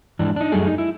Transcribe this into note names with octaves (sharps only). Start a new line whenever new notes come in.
G#2 E3 D4
D4 D#4
F#2 G3 A3 G#4
D#4
E4